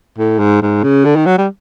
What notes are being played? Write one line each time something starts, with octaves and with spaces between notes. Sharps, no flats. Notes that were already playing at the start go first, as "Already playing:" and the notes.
A2
G#2
G#2
C#3
D3
D#3
F#3
G3